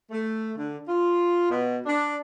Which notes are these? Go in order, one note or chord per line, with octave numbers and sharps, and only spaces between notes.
A3
D3
F4
B2
D4